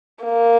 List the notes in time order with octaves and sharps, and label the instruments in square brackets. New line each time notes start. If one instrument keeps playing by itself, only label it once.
[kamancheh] A#3